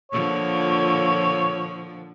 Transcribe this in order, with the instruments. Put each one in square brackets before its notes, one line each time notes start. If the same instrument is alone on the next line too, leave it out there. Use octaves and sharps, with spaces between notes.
[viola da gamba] A#2 D3 F3 [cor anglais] C#5